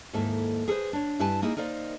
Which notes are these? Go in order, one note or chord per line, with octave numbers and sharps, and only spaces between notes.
D#2 G#2 A#3 E4 A4 E5
G#4 A4 B4 C5
D4 C#5
G2 E4 G4 B4 G#5 A5
A#3 D#4 E4 G#4
D#4 A#4 C5 D5 F5